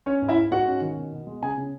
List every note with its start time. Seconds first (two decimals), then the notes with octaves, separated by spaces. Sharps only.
0.06 C#4 C#5
0.22 G#2
0.28 E4 E5
0.37 G#2
0.51 G#2 F#4 F#5
0.67 C#4
0.81 D#3
0.97 B2
1.12 B2
1.27 G#3
1.42 C#3 G#4 G#5
1.58 C#3